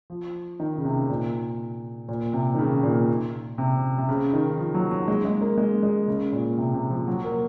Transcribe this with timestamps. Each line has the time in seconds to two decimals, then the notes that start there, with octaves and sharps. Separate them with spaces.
0.10 F3
0.60 D#3
0.78 C#3
0.85 C3
1.10 A#2
2.09 A#2
2.33 C3
2.54 D#3
2.59 C#3
2.83 A#2
3.58 C3
3.98 C3
4.09 C#3
4.33 D#3
4.57 F3
4.75 F#3
4.91 F#3
5.08 G#3
5.25 G#3
5.41 A#3
5.58 G#3
5.83 G#3
6.08 C#3
6.33 A#2
6.58 C3
6.74 C3
6.90 F3
7.07 F#3
7.24 A#3